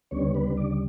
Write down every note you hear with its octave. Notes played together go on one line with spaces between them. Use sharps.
D2 C#3 G3 B3 C#4 D4 C#5
B3 B4
D4 D5